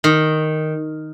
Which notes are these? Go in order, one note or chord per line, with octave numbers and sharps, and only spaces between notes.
D#3